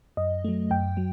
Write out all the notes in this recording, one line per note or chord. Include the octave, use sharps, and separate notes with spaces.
F#2 D#5
F#3 A3
F#2 G5
F#3